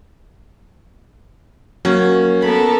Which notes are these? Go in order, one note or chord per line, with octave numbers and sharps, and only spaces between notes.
F#3 A#3 C#4
B3 A4 A#4 B5